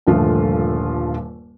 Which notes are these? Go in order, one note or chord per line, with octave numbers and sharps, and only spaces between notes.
D#1 G2 D3 F3 A3 F4